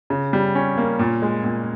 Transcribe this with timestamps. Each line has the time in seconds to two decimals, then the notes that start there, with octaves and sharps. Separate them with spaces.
0.10 C#3
0.33 G3
0.55 C#4
0.77 A#3
0.99 A#2
1.22 G#3
1.44 A#2